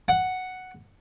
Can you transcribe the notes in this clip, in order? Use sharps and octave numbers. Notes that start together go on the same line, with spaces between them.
F#5